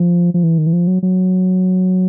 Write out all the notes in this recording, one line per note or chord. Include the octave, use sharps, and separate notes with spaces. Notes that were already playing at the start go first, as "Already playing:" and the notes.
Already playing: F3
F3
E3
D#3
E3
F3
F#3
F#3